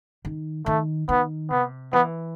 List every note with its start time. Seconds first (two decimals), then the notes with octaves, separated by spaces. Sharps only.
0.25 D#3
0.66 D#3 A3
1.09 D#3 B3
1.50 C3 B3
1.93 E3 B3